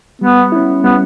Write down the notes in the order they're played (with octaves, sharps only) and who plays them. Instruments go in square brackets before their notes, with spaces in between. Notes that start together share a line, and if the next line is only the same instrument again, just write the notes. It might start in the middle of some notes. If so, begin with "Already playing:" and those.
[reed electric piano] G3 [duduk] B3
[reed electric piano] C#4 E4
[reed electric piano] G3 [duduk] B3